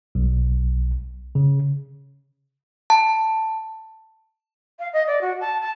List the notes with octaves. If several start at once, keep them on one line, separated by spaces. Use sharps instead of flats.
B1
C#3
A5
F5
D#5
D5
F#4
A5
A5